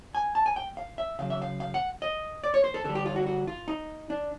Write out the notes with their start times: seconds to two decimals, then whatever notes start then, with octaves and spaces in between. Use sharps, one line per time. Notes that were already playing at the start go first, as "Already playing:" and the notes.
0.15 G#5
0.35 A5
0.46 G#5
0.56 G5
0.77 F5
0.98 E5
1.19 C#3 F#3 F5
1.30 E5
1.42 F5
1.60 F5
1.74 F#5
2.02 D#5
2.44 D5
2.54 C#5
2.64 C5
2.74 A4
2.84 D3 G3 A4
2.95 G4
3.06 F4
3.16 F#4
3.26 F#4
3.47 F4
3.68 D#4
4.10 D4